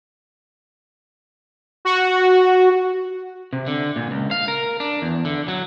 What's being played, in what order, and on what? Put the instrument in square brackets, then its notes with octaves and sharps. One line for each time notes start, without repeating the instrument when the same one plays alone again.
[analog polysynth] F#4
[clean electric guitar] C3
D3
A#2
C#2
F5
A#4
D4
E2
D3
F#3